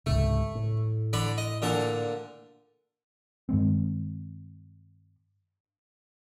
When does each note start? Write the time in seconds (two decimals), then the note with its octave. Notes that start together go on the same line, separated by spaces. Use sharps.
0.06 C#2 G#2 C3 A3
0.55 A2
1.13 D3 D5 B5
1.38 D#5
1.62 A#2 D3 A5
3.49 G2 D#3 G#3 C4